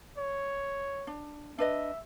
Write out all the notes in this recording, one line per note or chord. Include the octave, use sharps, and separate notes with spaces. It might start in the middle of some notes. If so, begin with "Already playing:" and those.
C#5
D4
D4 B4 D#5 E5